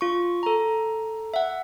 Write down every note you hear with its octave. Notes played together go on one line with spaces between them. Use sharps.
F4 C#6
A4 A#5
E5 F#5